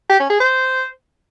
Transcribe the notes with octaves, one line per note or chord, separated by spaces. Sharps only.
G4
C#4
G#4
C5